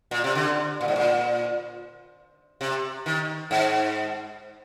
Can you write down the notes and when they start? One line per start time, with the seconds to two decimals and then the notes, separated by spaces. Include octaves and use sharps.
0.11 A#2
0.24 C3
0.35 D3
0.81 A#2
0.88 G#2
0.96 A#2
2.61 C3
3.06 D#3
3.51 G#2